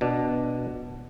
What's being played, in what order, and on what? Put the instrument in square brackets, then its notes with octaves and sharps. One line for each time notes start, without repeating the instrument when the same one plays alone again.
[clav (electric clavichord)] B2 D4